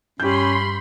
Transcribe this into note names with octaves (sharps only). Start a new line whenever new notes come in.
G2 C#4 G4 B5 C6 G6